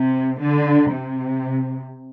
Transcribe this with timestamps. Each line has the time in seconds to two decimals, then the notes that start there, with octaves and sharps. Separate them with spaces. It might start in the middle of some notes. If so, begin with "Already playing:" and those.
Already playing: C3
0.41 D3
0.91 C3